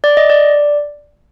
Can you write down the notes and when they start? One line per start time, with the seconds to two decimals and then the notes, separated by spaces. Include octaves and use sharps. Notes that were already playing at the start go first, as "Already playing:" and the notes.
0.04 D5
0.17 D#5
0.30 D5